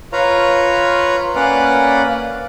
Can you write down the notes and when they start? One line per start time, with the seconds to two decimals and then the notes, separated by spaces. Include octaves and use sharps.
0.13 F4 B4 C#5 F5 A#5
1.35 A#3 C#4 B4 D5 F5 F#5